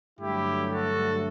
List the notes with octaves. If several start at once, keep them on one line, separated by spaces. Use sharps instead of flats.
G2 D3 F#3 A3 E4 G4
F#4 A4